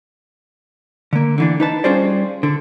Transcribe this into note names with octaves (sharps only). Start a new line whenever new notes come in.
D3 A#3
D3 E3 D4
D#4 B4 A5
G3 C#4 F4 G#4 C5 D5
D3